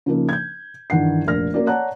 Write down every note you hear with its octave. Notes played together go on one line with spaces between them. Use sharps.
C#3 F3 A#3 D#4
G6 G#6
G2 D#3 E3 F#5 C7
F1 A#1 A#4 F6 A#6
A#3 C#4 F#4 D5
C#5 D5 F#5 A5 A#5 F#6